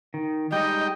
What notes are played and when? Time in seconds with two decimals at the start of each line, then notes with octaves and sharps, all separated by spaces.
0.14 D#3
0.52 G3 G#3 D#4 D#5 G5